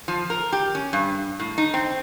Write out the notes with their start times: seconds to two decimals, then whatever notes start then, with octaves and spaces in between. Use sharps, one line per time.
0.08 F3
0.30 A#4
0.53 G4
0.75 C#4
0.93 G2
1.40 A2
1.58 D#4
1.74 C4